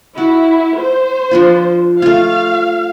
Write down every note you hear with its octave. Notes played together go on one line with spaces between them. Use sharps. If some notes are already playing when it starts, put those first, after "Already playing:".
E4 F#4
C5
F3 D4 F4
A3 F4 F5